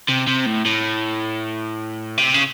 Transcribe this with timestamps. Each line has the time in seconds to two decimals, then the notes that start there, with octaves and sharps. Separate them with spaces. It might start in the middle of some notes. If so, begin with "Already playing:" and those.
0.09 C3
0.27 C3
0.46 A2
0.66 A2
2.18 C3
2.34 C#3